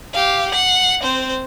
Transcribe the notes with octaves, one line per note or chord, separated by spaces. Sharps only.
G4 F5
F#5 C7
C4 C5